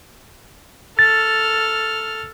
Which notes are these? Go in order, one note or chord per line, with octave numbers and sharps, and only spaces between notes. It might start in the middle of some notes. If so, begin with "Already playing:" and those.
A4 F6 A6